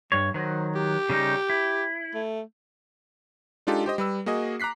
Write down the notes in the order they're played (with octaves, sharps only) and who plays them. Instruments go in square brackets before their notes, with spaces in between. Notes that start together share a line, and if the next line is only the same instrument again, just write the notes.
[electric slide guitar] G2 C#5 [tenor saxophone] G3
[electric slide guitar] D#3 F#3 [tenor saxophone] C5
[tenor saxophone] G4
[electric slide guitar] C#3 G3 D#4
E4
[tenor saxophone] A3
[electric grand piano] G#3 D4 D#4 F4 G4 A4
G4 C5 D#5
G3 B4 E6
A#3 F#4 G#4 D#5
A#5 D6 F#6 B6 C7